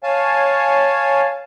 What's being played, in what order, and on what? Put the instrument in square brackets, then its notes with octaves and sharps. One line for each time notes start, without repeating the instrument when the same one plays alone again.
[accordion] C#5 F5 G#5 A5